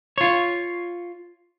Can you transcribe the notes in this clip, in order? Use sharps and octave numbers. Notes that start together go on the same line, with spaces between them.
F4 C#5